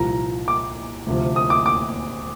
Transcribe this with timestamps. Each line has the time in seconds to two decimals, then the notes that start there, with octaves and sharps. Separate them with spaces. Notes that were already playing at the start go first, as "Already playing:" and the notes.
Already playing: C2 A#2 F3 A#5
0.48 D6
1.07 D2 C3 F3
1.36 D#6
1.50 D6
1.66 D6